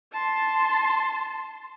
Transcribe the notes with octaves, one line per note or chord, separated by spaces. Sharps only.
A5 C6